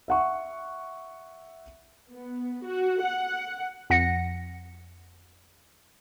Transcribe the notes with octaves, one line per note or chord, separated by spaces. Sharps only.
E5 F#5 C#6
B3
F#4
F#5
F2 F#5 A#6 C#7